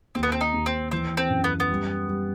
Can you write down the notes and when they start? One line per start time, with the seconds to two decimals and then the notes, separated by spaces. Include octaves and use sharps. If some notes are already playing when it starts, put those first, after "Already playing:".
0.15 D#2 C4
0.23 B3
0.32 C4
0.41 D#4
0.53 D#2
0.66 C4
0.91 E3 C4
1.17 C4
1.30 F#2
1.44 B3
1.60 B3
1.70 G3
2.08 G3